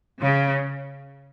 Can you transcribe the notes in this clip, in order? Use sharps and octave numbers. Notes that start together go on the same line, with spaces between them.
C#3